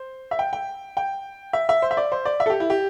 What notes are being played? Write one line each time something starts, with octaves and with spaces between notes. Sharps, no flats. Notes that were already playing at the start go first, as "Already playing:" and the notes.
Already playing: C5
E5
G5
G5
G5
E5
E5
C5
E5
D5
C5
D5
E5
A4
G4
E4
G4